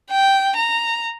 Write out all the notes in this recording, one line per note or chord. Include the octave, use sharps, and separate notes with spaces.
G5
A#5